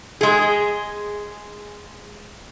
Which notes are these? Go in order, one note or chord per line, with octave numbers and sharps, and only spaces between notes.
G#3 G#4